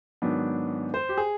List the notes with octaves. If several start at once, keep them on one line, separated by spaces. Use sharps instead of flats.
G#2 D#3 F#3 B3 D4
C5
G4
G#4